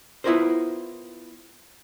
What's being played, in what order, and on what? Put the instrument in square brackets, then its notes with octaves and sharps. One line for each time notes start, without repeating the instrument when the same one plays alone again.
[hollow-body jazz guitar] B3 E4 F4 A#4 C5